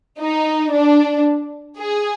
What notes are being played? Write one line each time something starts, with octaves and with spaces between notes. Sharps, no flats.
D#4
D4
G#4